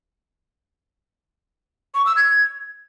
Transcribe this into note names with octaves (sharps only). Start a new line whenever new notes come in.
C#6
E6
G#6